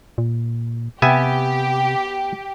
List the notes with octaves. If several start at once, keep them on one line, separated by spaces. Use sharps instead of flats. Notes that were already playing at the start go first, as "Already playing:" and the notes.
A#2
C3 B3 G4 E5 G#5